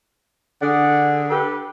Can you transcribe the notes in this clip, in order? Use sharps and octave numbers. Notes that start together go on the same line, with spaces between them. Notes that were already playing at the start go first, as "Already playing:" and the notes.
D3 G#4 D5 F#5
G4 A4 B4